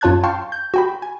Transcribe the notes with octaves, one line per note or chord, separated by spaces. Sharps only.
F#2 F4 C#5 A5 F#6 G#6
F5 G5 A5 C6 C#6
G6
F#4 G5 B5
G#5